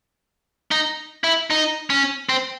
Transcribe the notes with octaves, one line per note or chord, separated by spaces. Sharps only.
D#4
E4
D#4
C#4
C4